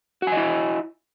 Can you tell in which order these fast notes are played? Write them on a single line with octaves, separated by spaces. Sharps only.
F#4 G#5 D#5 E4